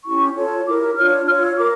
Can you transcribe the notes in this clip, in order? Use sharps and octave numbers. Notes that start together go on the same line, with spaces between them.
C#4 E4 G4 C#6
F4 A4 C#5
E4 G4 A#4 D6
D4 F4 C#5 F6
F4 C#5 F6
E6
F4 A#4 D6